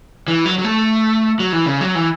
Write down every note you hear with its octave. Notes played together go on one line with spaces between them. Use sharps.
E3
F#3
F#3
A3
F#3
E3
C#3
F#3
E3